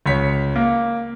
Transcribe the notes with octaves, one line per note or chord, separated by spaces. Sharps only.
C#2 C#5 B6
A#3